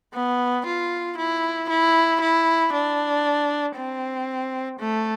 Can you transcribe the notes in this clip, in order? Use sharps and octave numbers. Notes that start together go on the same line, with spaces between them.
B3
F4
E4
E4
E4
D4
C4
A3